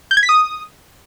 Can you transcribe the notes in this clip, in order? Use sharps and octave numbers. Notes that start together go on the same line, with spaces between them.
G6
G#6
B6
D#6